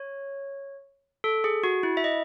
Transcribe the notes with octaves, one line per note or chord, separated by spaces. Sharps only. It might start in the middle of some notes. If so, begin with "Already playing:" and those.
Already playing: C#5
A4
G#4
F#4
E4
E5
D#5